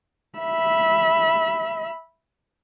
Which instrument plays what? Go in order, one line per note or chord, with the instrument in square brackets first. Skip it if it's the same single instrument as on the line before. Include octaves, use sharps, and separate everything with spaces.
[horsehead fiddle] E5 B5